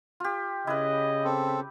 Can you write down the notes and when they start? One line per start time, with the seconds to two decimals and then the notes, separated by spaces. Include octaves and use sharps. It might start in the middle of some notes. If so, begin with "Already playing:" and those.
0.20 F4 G4
0.67 C#3 E4 B4 D#5
1.24 C4 A4